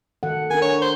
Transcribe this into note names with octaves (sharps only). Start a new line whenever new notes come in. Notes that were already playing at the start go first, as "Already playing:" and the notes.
D#3 A4 F#5
D4 A#4 G#5
C#5
C5